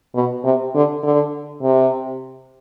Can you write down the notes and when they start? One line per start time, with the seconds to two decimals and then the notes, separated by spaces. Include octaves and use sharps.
0.15 B2
0.44 C3
0.74 D3
1.03 D3
1.63 C3